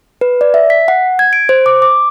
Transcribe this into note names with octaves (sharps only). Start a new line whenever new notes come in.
B4
D5
E5
B6
F#5
G#6
D7
C5
D6
D6